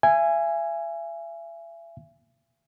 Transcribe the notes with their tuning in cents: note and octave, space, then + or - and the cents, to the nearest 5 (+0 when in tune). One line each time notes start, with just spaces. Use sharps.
E5 +35 G#5 -5